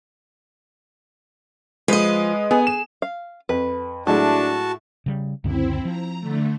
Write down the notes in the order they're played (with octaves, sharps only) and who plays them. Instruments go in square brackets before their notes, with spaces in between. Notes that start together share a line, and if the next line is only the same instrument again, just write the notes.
[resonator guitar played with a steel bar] F3 [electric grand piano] G#3 [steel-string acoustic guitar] B4 D#5
[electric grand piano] B3 [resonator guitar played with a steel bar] G#4
[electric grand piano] E7
[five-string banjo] F5
[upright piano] F2 [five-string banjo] B4
[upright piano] A2 G#3 E4 [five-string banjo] F#3 [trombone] D4 [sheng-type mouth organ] F#4 A5
[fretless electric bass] C#3 G3
[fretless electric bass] C#2 F#2 D3 [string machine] C4 E4
[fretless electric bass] F3 [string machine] A#5
[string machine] D3 A3